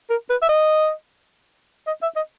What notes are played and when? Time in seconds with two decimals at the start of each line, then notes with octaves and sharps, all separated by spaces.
0.10 A#4
0.30 B4
0.42 E5
0.49 D#5
1.87 D#5
2.02 E5
2.16 D#5